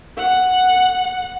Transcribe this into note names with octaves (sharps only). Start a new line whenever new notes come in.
F#5